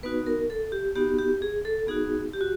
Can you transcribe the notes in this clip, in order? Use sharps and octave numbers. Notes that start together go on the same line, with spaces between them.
B3 D#4 F#4 B4
A#4
A4
G4
B3 D#4 F#4 G4
G4
G#4
A4
B3 D#4 F#4 G#4
G4
F#4